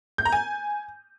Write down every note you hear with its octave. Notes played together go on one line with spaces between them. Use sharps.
G6
A#5
G#5